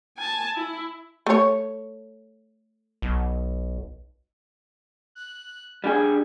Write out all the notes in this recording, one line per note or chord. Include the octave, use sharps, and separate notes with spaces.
G#5 A5
E4
A3 C#5
B1
F#6
G3 D4 G#4 G#5